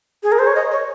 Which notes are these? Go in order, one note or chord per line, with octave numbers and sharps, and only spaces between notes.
G#4
A#4
C5
C#5
D#5
C#5